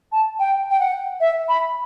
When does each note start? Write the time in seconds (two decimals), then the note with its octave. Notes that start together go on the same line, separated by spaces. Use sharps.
0.12 A5
0.39 G5
0.70 G5
0.80 F#5
1.21 E5
1.49 B5